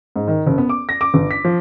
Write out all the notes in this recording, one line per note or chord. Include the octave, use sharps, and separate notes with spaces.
G#2
D#3
F#1
B3
D6
A#6
D6
G1
B6
F3